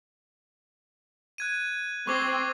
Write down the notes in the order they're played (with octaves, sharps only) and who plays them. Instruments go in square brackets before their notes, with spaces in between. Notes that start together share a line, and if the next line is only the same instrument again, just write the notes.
[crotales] F#6 G#6 D#7
[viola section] C4 [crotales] C#6 D6 G#6